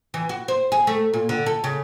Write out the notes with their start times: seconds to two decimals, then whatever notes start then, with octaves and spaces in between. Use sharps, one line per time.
0.14 E3
0.29 F#4
0.48 C5
0.72 G#4
0.87 A3
1.14 A#2
1.29 D3
1.46 A4
1.64 C#3